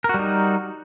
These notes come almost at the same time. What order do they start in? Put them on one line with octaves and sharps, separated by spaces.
A#4 F#4 G3 D#4